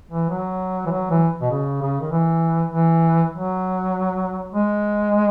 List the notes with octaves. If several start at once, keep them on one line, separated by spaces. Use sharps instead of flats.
E3
F#3
E3
F#3
E3
B2
C#3
C#3
D#3
E3
E3
F#3
G#3